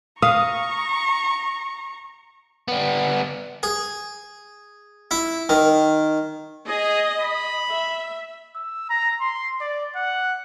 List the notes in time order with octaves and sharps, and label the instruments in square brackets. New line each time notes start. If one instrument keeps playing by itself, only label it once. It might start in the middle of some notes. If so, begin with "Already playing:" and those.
[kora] F5 [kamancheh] A#5 C#6 [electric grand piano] D#6
[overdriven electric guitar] G3 B3
[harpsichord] G#4
E4
D#3
[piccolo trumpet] G#4 [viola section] D#5
[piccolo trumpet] B5
[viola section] E5
[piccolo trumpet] E6
A#5
C6
D5
F#5